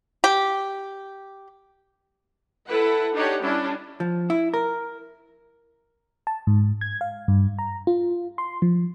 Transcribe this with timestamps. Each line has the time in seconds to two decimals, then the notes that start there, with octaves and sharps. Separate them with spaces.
0.24 G4
2.68 E4 A4 B4 F#5
3.13 D4 D#4 G4 C#5 F#5
3.42 G3 C#4 D4 E4
4.00 F3
4.30 E4
4.54 A#4
6.27 A5
6.47 G#2
6.81 G#6
7.01 F5
7.28 G2
7.59 A#5
7.87 F4
8.38 C6
8.62 F3